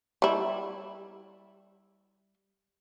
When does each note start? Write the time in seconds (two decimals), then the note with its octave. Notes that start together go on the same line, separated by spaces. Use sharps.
0.22 G3 E4